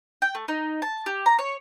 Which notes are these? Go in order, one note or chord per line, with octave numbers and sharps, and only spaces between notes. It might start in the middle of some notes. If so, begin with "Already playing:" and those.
G5
A3
D#4
A5
G4
A#5
C#5